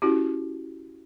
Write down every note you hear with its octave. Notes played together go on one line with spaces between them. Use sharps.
C#4 E4 F#4 G4